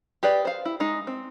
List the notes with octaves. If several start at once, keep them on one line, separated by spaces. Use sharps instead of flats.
G4 G#4 B4 D5
C5 F5
E4
G#3 D#4
C4